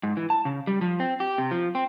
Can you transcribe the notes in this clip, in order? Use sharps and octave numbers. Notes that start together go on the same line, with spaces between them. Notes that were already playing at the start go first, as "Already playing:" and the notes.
G#2
E3
A5
C#3
G3
F3
C4
G4
C3
F3
C4